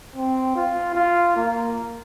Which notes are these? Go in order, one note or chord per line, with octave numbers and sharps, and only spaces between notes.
C4
F4
F4
A#3